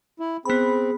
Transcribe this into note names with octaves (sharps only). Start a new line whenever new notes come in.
E4
B3 C4 G#4 B5